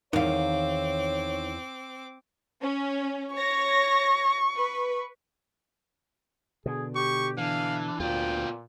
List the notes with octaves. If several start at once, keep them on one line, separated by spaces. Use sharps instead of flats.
E2 D#3 C4 C#5 F5 D6
C#4
C#5 C#6 A#6
B4
B2 D3 G#4
G4 C#6
E3 D4 F5
D2 A#2 B3 F4 G5